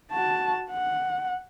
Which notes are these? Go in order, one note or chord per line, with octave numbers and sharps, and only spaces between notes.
F#4 A5
F#5